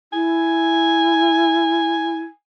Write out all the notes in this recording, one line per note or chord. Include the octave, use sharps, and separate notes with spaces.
E4 G#5